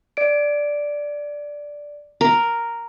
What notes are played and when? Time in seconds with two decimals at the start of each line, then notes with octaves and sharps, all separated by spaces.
0.17 D5 D7
2.21 A#4